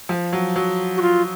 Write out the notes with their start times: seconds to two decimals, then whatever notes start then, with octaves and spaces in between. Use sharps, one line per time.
0.09 F3
0.33 F#3
0.56 F#3
0.97 F#4
1.02 F4